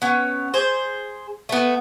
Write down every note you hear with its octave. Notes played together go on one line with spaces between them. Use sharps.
B3 C#4
G#4 C5
A3 B3